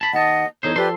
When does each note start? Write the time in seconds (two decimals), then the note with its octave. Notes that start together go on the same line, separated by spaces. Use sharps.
0.01 A5 B5
0.13 D#2 D#5 F#5 A5
0.63 E2 D#4 A4 C5 C#5
0.76 F3 G4 A4 B4 D5 C6